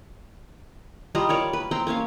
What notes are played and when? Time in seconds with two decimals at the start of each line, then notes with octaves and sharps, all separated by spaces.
1.15 G3 F4 D#5 A#5
1.29 A#4 C#5 D5 A5
1.53 B4
1.71 C4 G5 A#5 C6
1.87 A#3 C#4 C#5 F5